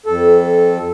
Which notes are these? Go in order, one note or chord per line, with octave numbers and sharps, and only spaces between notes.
F2 A4